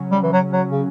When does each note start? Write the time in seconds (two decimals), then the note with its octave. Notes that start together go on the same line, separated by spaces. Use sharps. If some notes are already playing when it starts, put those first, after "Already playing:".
Already playing: C#3 F#3 C#4
0.11 G3
0.23 E3
0.33 F#3
0.53 F#3
0.72 C#3